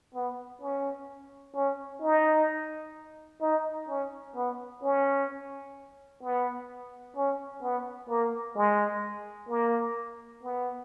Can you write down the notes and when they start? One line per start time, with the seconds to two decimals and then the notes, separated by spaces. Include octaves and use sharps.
0.15 B3
0.62 C#4
1.55 C#4
2.02 D#4
3.42 D#4
3.89 C#4
4.36 B3
4.83 C#4
6.23 B3
7.16 C#4
7.63 B3
8.09 A#3
8.56 G#3
9.49 A#3
10.43 B3